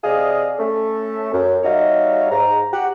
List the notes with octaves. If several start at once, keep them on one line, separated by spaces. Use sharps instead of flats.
C3 G#4 D5 D#5 F5
A3 C#4 A4
F#2
G3 D#4 F#4 C#5 E5 F5
G#2 A#5
F#4 G4 F#5